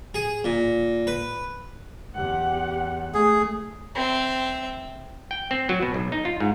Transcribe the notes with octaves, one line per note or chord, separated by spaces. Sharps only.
G#4
A#2
B4
E2 G4 F#5
A3 G#4
C4 E5
G5
C4
F#3
B2
B1
D#4
F4
G#2